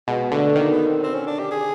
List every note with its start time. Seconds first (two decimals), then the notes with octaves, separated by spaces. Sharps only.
0.08 B2 G#3
0.31 D3 A3
0.55 D#3 A#3
0.72 B3
0.87 C4
1.04 C4
1.15 C#4
1.27 D4
1.39 G4
1.51 G#4